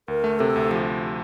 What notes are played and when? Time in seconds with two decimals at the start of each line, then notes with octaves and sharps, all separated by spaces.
0.08 D2 A#4
0.24 A3
0.39 C3 A4
0.56 D2
0.71 F3 G4